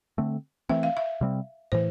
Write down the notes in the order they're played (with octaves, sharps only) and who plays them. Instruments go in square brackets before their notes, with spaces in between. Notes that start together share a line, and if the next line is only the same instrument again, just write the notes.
[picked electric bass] D3 A3 C4
[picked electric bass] E3 A3 C4 [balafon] E5
[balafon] F5
E5
[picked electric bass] C3 G3 C4
[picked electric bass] A2 E3 [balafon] C5